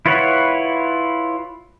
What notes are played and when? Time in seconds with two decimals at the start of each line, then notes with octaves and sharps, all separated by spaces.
0.06 E4 F4 B4 C#5 F#5